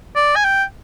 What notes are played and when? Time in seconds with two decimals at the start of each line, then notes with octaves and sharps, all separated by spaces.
0.16 D5
0.36 G#5
0.45 G5